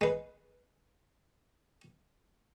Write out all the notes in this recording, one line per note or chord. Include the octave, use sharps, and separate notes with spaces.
G#3 B4